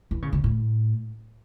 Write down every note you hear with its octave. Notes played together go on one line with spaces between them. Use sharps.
E3
C#3
C#3
A2